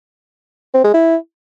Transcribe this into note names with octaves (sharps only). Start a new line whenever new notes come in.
C4
G#3
E4